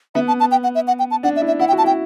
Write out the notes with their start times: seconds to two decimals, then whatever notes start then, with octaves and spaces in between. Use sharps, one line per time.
0.15 B3 E5
0.28 A5
0.40 A5
0.51 G5
0.64 F#5
0.75 E5
0.88 F#5
0.99 G5
1.11 A5
1.23 D4 F#5
1.36 E5
1.42 E4
1.47 E5
1.59 E4 F#5
1.68 G5
1.72 F#4
1.78 A5
1.84 E4 G5